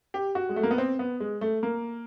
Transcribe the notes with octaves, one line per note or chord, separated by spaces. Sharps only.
G4
F#4
G#3
A3
A#3
B3
C4
B3
G#3
A3
A#3